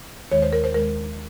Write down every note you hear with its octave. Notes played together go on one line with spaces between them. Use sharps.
D#2 D#3 G#3 C#5
C5
A#4
C5
D#2 D#3 G#3 A#4